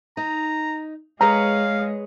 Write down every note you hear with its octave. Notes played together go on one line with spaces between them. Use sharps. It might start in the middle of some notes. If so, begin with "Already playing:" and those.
D#4 A#5
G#3 G#4 B4 C#5 F5 A#5